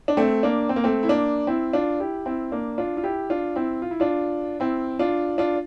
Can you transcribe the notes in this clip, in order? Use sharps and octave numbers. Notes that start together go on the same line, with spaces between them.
D4
A3 C4
A#3 D4
C4
A#3
A3 C4
E4
A#3 D4
C4 E4
D4 F4
E4 G4
C4 E4
A#3 D4
D4 F4
F4
E4 G4
D4 F4
C4 E4
F4
E4
D4 F4
C4 E4
D4 F4
D4 F4